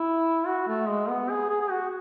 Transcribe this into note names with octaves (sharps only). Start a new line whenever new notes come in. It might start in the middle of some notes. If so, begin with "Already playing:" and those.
Already playing: E4
F#4
A3
G#3
B3
G#4
G#4
G#4
F#4